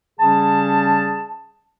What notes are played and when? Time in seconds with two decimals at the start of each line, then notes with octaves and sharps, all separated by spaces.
0.20 C#3 G3 C#4 G#4 A5